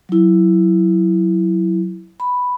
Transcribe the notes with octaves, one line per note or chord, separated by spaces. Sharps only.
F#3 E4
B5